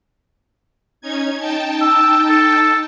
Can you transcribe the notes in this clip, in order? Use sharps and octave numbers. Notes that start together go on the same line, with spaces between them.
C#4 D#4 G#6
D#4 G5 A5
E6
A4